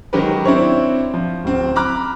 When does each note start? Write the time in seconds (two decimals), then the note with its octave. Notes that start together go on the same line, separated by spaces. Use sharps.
0.13 D#3 F#3 G#3 G4 A#4 B4
0.45 C4 D4 E4 C#5
1.14 F3
1.44 D1 C4
1.76 A#5 B5 D6 F6 F#6